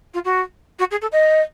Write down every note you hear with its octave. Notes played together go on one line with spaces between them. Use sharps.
F4
F#4
F#4
G#4
A4
D#5